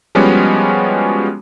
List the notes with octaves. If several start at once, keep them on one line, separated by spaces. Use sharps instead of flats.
F3 G3 G#3 B3 C#4 F#4